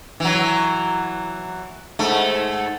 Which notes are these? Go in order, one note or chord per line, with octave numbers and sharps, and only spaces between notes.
E3 F#3
G#2 A3